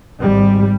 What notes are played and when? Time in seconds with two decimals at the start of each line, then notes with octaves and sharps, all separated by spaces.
0.21 G#1 G#2 G3